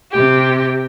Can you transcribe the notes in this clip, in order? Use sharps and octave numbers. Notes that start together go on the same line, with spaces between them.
C3 G4